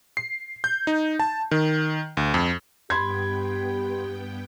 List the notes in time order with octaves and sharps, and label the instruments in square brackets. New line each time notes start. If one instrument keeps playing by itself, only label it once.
[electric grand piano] C7
G6
D#4
A5
D#3
D2
F2
[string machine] G2 B3 G5 [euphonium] G4 [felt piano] B5 C6 G#6